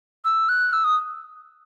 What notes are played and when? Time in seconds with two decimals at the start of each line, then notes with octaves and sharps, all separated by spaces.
0.25 E6
0.49 F#6
0.73 E6
0.84 D#6